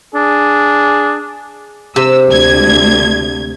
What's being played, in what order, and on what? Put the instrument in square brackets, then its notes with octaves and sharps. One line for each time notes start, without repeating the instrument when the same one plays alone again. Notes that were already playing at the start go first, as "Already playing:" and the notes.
[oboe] D4 [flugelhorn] G#4
[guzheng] C3 [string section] E6
[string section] D2 G#6